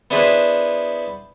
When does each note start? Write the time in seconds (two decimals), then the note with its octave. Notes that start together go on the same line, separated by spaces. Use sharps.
0.11 B3 D4 E4 G#4 B4 C5